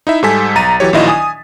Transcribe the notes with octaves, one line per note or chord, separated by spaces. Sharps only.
D#4 E4 E5
G#2 G3 A4 G#5 B6
B1 A#5 A6 D#7
E3 F#3 G4 C#5
A#1 D#3 F#3 E4 F4 D#5
G#5 D#6